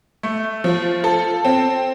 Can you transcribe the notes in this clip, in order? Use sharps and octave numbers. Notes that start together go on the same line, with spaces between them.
A3
F3
A4
C4